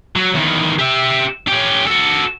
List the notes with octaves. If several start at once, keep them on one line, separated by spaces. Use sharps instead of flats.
F#3
E2 D#3
G4 E5
C#4 G4
F#4 A4